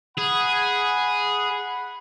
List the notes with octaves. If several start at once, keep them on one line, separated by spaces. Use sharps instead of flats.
G#4 F#5 B5